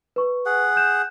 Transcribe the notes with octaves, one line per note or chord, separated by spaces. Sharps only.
B4 C#6
G#4 F#5
F#6 G6 E7